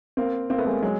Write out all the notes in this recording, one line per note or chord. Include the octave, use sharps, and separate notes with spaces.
A#3 C4
A#3 C4
A3 B3
G#3 A#3
F#3 G#3